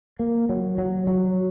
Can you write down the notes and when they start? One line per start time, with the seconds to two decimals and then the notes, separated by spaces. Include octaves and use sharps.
0.19 A#3
0.49 F#3
0.78 F#3
1.07 F#3